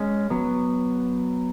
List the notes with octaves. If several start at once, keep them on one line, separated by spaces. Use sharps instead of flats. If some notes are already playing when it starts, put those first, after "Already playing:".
Already playing: G#3 C#4
F#3 B3